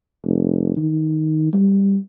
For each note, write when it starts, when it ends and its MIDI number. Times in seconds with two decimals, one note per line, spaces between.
0.25 0.74 29
0.77 1.49 51
1.53 1.97 55